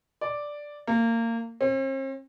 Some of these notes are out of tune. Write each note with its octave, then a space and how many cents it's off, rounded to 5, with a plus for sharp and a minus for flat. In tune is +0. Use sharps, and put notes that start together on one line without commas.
D5 +0
A#3 -25
C4 +45